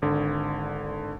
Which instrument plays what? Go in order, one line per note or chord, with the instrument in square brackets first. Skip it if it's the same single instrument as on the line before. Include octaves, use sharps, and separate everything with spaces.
[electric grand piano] G#1 D3